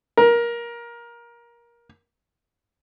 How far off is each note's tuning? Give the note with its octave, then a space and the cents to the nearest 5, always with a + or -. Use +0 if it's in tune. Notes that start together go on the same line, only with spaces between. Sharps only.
A#4 +20